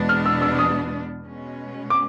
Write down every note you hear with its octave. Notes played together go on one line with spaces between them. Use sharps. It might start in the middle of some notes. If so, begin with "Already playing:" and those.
Already playing: E2 B2 G#3 B3 D4
F6
E6
E6
D#6
B2 G#3 C#4
D6